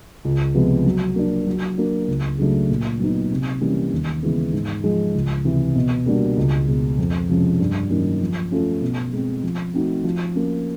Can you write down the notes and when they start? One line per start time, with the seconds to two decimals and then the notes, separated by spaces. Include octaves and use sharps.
0.25 C#2
0.54 C3 F3 G#3 B3
0.86 F#3
1.16 A#3 D4
1.47 F#3
1.78 A#3 D4
2.08 C#2
2.38 C#3 F#3 A3 D4
2.70 A#2
3.00 F#3 B3 D#4
3.31 C3
3.61 E3 G3 A#3 C#4
3.92 D#2
4.23 C#3 E3 G#3 B3
4.53 G#2
4.84 F3 G#3
5.15 C#2
5.45 C3 E3
5.75 B2
6.06 G3 A#3 D4 F#4
6.37 C#2
6.68 B2 G#3
6.98 F2
7.29 C3 F3 G#3 C#4
7.60 G2
7.90 D#3 F#3 A#3 C#4
8.21 F3
8.51 A3 C#4 F4 A4
8.82 B2
9.13 G#3 C4
9.43 F3
9.74 A3 C4 D#4 F#4
10.04 F3
10.35 A#3 C#4